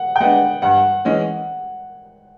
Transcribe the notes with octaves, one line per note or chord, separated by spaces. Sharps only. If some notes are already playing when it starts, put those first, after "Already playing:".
Already playing: F#5
G5
G#3 B3 D4 F#5
G2 F#5
E3 G#3 C#4